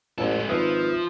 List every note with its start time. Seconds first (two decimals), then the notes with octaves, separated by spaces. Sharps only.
0.18 A1 G#3 A4
0.49 G#1 F3 B4 E5 D#6